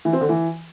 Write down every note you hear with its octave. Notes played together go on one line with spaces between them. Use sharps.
E3
C4
D3
E3